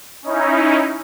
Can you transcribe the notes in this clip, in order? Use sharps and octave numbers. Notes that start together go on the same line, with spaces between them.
C#4 D#4 E4